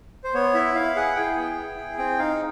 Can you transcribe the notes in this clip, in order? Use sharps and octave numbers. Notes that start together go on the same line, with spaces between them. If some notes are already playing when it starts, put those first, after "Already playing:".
C5
B3 C#5
E4 E5
E4 F5
G#4 F#5
G#4 G5
B3
E4
G#4
C4 G5
D#4 F5